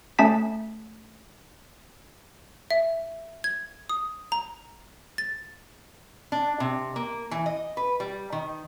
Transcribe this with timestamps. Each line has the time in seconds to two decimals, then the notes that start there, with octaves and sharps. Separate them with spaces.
0.19 A3 C#4 A5 B6
2.70 E5
3.44 G#6
3.89 D#6
4.32 A#5
5.18 A6
6.32 D4
6.60 C3
6.96 A#3
7.31 E3
7.46 D#5
7.77 B4
8.00 G3
8.32 D#3